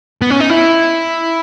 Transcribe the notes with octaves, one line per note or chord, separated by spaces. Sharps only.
B3
C#4
D#4
E4